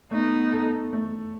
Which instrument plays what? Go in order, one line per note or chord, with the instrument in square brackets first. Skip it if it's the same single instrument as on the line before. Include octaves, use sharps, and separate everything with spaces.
[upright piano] A3 [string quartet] B3 D#4
[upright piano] A4
A3